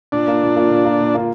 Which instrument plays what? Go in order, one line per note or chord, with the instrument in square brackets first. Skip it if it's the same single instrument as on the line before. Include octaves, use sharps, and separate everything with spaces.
[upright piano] A#2 [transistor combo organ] D4
[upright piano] A#3 F4
A#2
A#3 F4
A#2
A#3 F4
A#2
A#3 F4